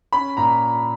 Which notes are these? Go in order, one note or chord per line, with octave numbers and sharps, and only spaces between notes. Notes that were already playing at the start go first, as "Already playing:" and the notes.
C#4 B5
A#2 A#5